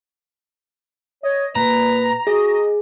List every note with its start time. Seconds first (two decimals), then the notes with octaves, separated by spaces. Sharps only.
1.23 C#5 D#5
1.56 A#2 B4 A#5
2.27 F#4 G#4 D#5